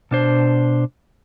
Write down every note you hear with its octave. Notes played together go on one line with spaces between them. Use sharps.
B2 D4 C5